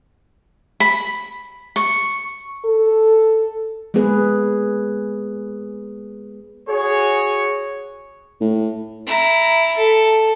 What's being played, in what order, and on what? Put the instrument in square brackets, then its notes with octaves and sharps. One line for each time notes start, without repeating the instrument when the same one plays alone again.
[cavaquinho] B5
C#6
[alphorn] A4
[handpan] G#3 A#3 B3 G#4 B4
[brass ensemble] F#4 G#4 C#5
[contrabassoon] A2
[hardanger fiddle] E4 A#5
A4